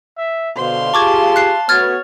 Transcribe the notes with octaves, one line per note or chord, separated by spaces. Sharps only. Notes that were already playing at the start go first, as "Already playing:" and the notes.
E5
B2 D3 C5 F5 C6
F4 G4 G#4 A5 C#6 D6 G#6
F#6 C7
A3 B3 F#4 C#5 F6 G#6 A6